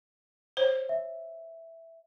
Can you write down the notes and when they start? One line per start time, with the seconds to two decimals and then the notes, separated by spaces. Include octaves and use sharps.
0.57 C5 C#5
0.89 E5